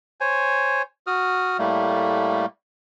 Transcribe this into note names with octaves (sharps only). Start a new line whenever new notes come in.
C5 C#5 G#5
F#4 D#6 F6
A2 G3 A3 A#3